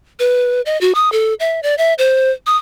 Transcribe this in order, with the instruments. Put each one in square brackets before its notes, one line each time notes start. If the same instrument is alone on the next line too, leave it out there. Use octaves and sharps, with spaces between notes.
[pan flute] B4
D#5
F#4
D#6
A4
E5
D5
E5
C5
D#6